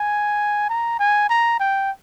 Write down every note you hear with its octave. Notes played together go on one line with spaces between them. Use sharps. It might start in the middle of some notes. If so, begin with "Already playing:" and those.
Already playing: G#5
A#5
G#5
A#5
G5